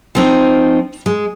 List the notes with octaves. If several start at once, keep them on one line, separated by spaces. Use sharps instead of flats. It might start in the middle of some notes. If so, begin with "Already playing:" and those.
F3 C4 D#4
G#3